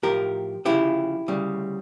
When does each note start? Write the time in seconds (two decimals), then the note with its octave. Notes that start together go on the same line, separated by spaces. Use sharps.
0.03 A2 F3 G4 A#4
0.65 D2 C#3 F3 E4 G4
1.28 D2 C#3 G3